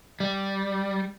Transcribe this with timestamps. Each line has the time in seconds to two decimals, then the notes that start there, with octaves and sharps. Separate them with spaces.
0.20 G3